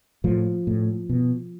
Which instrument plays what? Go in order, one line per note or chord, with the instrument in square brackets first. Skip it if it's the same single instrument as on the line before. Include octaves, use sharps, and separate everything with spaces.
[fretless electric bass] A2 F3
A2
B2